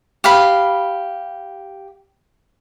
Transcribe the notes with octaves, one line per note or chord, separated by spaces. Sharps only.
G4 F5 B5